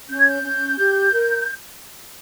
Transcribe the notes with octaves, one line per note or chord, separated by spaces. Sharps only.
C#4 G6
G#6
G6
C#4
G4
A#4